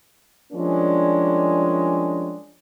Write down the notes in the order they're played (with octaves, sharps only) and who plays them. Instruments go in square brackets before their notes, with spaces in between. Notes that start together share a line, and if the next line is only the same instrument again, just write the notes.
[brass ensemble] F3 G3 G#3 A#3 C#4 D4